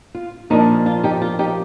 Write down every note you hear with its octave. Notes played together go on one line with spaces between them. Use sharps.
F4
A#2 F3 A#3 D4 D#4
F4
D#4 G4
F4
D#4 G4